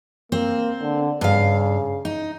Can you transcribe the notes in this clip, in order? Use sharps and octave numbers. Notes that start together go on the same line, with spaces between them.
A#3 C4
D3
G2 C#3 F5
D#4